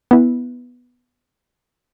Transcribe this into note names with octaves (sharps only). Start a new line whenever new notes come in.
B3 E4